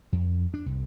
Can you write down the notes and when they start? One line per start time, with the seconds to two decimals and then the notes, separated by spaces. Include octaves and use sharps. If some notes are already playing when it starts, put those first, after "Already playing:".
0.12 F2
0.54 D4
0.66 C2